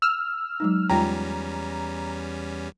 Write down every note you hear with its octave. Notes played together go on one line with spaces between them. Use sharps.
E6 F6
F#3 G#3 D#4
E2 G3 G#3 C#4 F4 G5 A#5